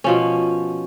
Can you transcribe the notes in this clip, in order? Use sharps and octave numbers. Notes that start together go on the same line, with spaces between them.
B2 F3 C#4